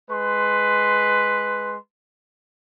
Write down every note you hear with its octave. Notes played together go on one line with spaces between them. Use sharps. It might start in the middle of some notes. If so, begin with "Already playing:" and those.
G#3 B4 C6